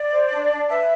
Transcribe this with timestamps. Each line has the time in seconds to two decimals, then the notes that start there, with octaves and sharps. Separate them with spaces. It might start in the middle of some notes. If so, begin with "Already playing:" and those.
Already playing: D5
0.11 C5
0.30 D4
0.50 D4
0.69 B4 E5